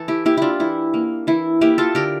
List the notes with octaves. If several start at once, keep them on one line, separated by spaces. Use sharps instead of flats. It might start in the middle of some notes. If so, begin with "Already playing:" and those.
Already playing: E3 A4
E4 G4
A#3 E4 G4
D4 E4 F4
E3 E4
A#3
E3 E4
A#3 E4 G4
F4 A4
D3 G4 A#4